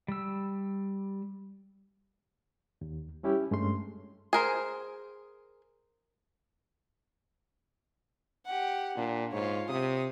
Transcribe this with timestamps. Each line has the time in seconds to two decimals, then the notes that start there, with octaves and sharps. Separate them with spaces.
0.08 G3 E6
2.81 D#2
3.23 G3 C#4 E4 G4
3.51 G2 G#3 A3 C#4 C6
4.33 G#4 A#4 C5
8.45 G4 F#5
8.97 A#2 D4
9.32 G#2 F4 C#5
9.69 C3 D#6